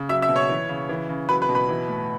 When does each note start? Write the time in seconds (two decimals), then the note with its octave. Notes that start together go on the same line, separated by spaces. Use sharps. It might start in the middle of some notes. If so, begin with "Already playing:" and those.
Already playing: C#3
0.09 F#3 E5 E6
0.22 E5 E6
0.29 B2
0.36 C#5 C#6
0.49 E3
0.69 C#3
0.89 E3
1.09 C#3
1.29 F#3 B4 B5
1.42 B4 B5
1.49 B2
1.55 B4 B5
1.69 E3
1.88 A2